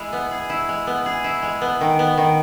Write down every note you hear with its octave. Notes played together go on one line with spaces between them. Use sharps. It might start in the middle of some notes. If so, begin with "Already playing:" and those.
Already playing: G#3 E4 G#4
B3
G#4
E4
G#3
B3
G#4
E4
G#3
B3
D#3
B3
D#3